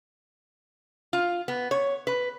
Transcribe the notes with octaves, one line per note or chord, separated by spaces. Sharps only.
F4
B3
C#5
B4